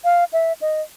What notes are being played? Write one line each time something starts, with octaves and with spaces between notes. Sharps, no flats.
F5
E5
D#5